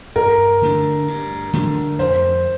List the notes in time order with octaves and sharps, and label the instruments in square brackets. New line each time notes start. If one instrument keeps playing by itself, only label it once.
[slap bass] G2 [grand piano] A#4
[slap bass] D3 A3 D4
G2
D3 A3 D4
[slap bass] F2 [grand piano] C5